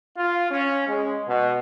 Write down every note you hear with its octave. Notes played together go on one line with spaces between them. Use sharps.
F4
C#4
G#3
B2